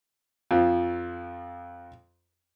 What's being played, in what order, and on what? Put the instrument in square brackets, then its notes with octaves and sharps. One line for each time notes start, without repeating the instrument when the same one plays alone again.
[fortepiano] F2 F3